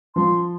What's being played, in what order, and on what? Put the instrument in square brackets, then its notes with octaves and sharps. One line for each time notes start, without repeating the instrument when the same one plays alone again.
[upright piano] F3 [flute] C6